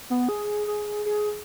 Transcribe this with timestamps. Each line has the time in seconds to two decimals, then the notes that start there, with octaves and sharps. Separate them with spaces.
0.10 B3
0.29 G#4
0.67 G#4
1.06 G#4